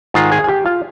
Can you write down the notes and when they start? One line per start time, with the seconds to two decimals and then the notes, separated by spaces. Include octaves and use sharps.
0.14 G#2 D#3 G#3 F4 F5
0.32 G#4 G#5
0.44 G#5
0.49 G4 G5
0.66 F4 F5